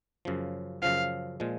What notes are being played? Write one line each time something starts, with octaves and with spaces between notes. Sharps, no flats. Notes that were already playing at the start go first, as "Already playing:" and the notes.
F#2 C#3 F3
F#2 C#3 F3 F5
A#2 F3 G#3